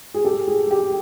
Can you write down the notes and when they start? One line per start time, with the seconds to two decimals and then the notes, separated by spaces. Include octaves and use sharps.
0.14 G#4
0.25 G4 A4
0.48 G#4
0.71 G4